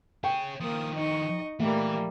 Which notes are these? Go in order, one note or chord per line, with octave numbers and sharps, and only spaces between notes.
G#4 C#5 G5
D#3 F3 A#3 D#6
D#4 D#5 C#6
A#2 E3 G3 A3 A#3